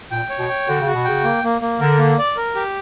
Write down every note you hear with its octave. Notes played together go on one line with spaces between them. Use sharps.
A#2 G5
C#5
B2
G5
D3 F#4
C#3
F#4
B2
C#3 G5
A#3
A#3
A#3
D3 A#4
A#3
D5
A#4
G4